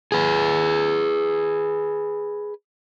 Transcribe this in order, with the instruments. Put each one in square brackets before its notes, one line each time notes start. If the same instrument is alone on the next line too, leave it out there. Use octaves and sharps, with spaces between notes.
[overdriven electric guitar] G#4 B4